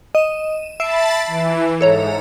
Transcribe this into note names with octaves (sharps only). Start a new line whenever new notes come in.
D#5 D#7 E7
E5 A5 B5 A6 C7 D7
E3
G#2 A4 C#5 A#5